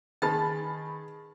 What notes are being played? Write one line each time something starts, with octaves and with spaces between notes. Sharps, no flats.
D#3 D#4 G#4 B4 G5 B5 A6